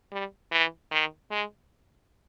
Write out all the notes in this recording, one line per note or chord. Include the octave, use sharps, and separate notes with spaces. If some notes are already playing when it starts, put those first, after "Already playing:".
G3
E3
D#3
G#3